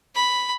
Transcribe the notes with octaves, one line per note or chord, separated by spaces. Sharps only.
B5